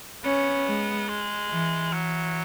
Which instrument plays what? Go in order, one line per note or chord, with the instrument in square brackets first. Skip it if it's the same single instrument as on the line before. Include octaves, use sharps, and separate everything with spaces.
[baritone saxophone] B3 [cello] C#4
[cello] G#3
[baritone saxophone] G#3
[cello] E3
[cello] E3 [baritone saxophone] F#3